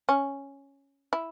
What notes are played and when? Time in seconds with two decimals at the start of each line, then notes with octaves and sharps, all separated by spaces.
0.09 C#4
1.13 E4